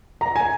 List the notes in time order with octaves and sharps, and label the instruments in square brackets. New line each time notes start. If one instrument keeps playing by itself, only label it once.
[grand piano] A#5
G#5